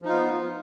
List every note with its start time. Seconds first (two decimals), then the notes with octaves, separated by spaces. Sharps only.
0.02 F3
0.05 D#4
0.09 F4
0.12 B3